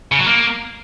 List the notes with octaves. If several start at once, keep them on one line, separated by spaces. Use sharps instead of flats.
C#3
F#3
A#3